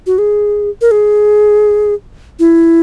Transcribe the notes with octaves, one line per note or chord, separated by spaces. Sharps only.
F#4
G#4
A#4
G#4
E4